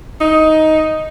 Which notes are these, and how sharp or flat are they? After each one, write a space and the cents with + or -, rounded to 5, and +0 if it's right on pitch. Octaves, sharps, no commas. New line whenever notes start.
D#4 +10